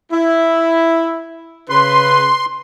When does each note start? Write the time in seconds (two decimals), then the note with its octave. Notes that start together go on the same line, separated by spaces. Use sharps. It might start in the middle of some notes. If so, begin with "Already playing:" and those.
0.12 E4
1.70 C#3 B4 C6